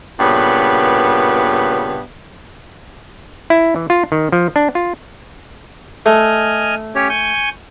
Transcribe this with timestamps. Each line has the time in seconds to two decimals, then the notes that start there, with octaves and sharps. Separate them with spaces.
0.20 G2 A#2 C#3 B3
3.50 E4
3.76 E3
3.90 F4
4.12 D#3
4.32 F3
4.56 D4
4.75 F4
6.06 A3 D#5 G#5 F6
6.95 C#4 G4 C#5
7.10 G#5 C#6 G6